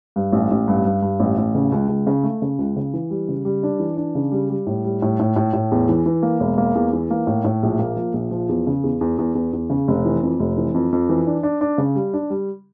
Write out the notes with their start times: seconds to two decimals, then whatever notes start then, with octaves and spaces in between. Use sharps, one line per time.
0.16 G2
0.32 A1
0.51 A1
0.68 G2
0.85 G2
1.02 G2
1.20 A1
1.38 A1
1.55 C#3
1.72 C#2
1.89 C#2
2.07 C#3
2.23 A3
2.42 C#3
2.59 C#2
2.76 C#3
2.94 E3
3.10 G3
3.28 C#3
3.45 G3
3.63 D4
3.80 E3
3.97 D4
4.15 C#3
4.32 G3
4.50 G3
4.67 A2
4.84 G3
5.02 A2
5.20 A2
5.36 A2
5.53 A2
5.72 E2
5.89 E3
6.06 E3
6.23 A#3
6.40 E1
6.58 A#3
6.75 E2
6.93 E3
7.11 A#3
7.27 A2
7.44 A2
7.63 A#1
7.79 A#3
7.96 F3
8.14 A#1
8.31 F3
8.49 E2
8.67 C#3
8.84 E2
9.01 E2
9.18 E2
9.35 E2
9.53 E2
9.70 C#3
9.88 F1
10.05 E3
10.23 F2
10.40 F1
10.57 E3
10.74 F2
10.92 F2
11.09 E3
11.27 D4
11.43 D4
11.61 D4
11.78 C#3
11.95 G3
12.13 D4
12.30 G3